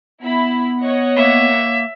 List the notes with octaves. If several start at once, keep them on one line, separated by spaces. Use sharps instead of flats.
B3 E4 B5
C#5 D#5 F#5
A#3 E5